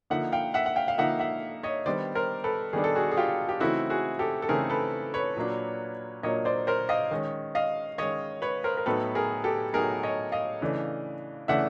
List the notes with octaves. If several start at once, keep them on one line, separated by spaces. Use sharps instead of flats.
D3 F3 A#3 D#4 E5 F#5
F5 G5
E5 F#5
F#5
F5 G5
F5
D3 F3 A#3 D#4 E5 F#5
E5 F#5
C#5 D#5
D#3 G3 B3 D4 C5 D5
A#4 C5
A4 B4
D#3 G3 B3 D4 G#4
A4
F#4 G#4
G#4
F4 G4
G4
C#3 E3 A3 C4 D#4 E4 F#4
F#4 G#4
G4 A4
A4
C#3 E3 A3 C4 D#4 G#4 A#4
A4 B4
B4 C#5
A#2 F#3 A#3 D4
A#2 F#3 A#3 D4 C#5 D#5
C5 D5
A#4 C5
D#5 F5
D#3 G#3 C#4
D#5 F5
D#3 G#3 C#4 C#5 D#5
B4 C#5
A#4 C5
A#4
A2 F#3 B3 D#4 A4 B4
G#4 A#4
G4 A4
A2 F#3 B3 D#4 G#4 A#4
C#5 D#5
D#5 F5
C#3 E3 A3 D4
C#3 E3 A3 D4 E5 F#5